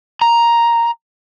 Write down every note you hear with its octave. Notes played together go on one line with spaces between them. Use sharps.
A#5